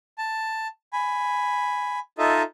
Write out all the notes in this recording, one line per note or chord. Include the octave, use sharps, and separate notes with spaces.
A5
G#5 B5
D#4 F4 A4 D#5 E5